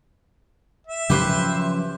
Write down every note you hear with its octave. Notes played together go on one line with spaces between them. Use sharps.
E5
C#3 F3 F#3 G4 B4 C5